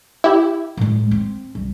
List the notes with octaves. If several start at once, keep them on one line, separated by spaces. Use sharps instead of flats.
E4 G4
A2 G#3
C4
C2